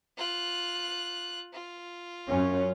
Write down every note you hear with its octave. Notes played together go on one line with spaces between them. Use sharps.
F4 F#6
F4
F#2 C#4